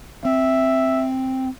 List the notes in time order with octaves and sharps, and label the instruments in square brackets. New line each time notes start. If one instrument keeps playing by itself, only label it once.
[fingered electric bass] C4 [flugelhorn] E5